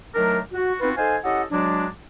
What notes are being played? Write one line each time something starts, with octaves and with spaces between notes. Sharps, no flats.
D#3 F#3 A3 D4 A#4
F#4
B3 C4 D#4 F4 F#4 B4
D#4 A4 C5 F5 G#5
C#4 E4 G4 A4 D#5 F#5
F#3 G#3 D4